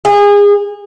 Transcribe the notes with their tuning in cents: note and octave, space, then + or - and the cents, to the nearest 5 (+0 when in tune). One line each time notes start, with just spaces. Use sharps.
G#4 -30